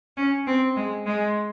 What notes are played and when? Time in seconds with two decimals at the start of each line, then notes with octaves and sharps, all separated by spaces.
0.17 C#4
0.47 C4
0.76 G#3
1.06 G#3